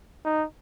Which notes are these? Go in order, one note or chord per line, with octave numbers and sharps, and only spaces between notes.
D#4